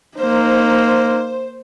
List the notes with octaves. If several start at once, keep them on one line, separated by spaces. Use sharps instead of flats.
A#3 D#4 C5